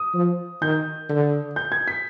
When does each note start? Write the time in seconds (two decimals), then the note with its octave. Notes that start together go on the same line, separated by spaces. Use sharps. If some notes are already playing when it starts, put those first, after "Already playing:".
Already playing: D#6
0.14 F3
0.62 D#3 G6
1.09 D3
1.56 G6
1.72 G#6
1.87 B6